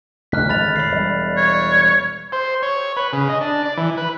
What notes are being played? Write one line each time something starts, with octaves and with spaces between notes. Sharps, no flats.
F1 D2 F6 F#6 B6
G#1 D3 G#3 B5 A6 F7
E2 A2 B5 C7
E1 G3
C#5
C5
C#5
B4
C#3
D#5
D4
D5
E3
B4